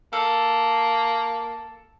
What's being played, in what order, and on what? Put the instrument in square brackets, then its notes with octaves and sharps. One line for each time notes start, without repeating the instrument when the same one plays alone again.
[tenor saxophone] A#3 [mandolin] A4